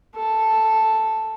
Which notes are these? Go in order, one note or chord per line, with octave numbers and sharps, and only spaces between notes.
A4